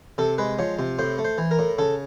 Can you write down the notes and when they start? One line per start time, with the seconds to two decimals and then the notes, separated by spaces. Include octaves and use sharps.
0.18 C3 A4
0.38 G#3 B4
0.59 F3 C#5
0.79 C3
0.99 A2 C5
1.18 A3
1.25 C5
1.38 E3
1.51 A#4
1.59 A2
1.78 C#3 A4